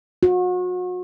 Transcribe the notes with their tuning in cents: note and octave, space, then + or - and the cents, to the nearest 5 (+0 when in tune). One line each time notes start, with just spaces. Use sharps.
F#4 -35